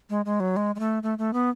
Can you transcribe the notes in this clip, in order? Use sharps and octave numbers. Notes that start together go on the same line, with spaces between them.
G#3
G#3
F#3
G#3
G#3
A3
A3
A3
B3